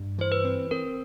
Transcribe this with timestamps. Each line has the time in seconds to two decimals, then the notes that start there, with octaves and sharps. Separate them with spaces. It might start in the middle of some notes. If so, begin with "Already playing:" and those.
Already playing: G2
0.18 E3 C5
0.32 B4
0.44 C4
0.71 C4 A#4